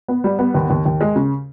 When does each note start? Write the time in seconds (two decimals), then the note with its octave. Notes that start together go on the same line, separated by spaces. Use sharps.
0.08 B3
0.24 G3
0.39 B3
0.54 D#2
0.70 D#2
0.85 D#2
1.01 G#3
1.16 C#3